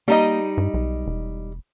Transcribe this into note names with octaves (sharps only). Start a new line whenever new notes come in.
G3 A#3 D#4 D#5
G2
B1
E1